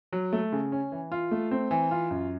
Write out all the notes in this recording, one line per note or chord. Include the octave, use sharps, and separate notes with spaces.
F#3
A3
C#3
C#4
E3
F4
A3
C4
E3
F4
F#2